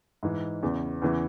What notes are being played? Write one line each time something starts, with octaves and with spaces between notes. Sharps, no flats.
G#2 E3
E2 C#3 E3
E2 C#3 E3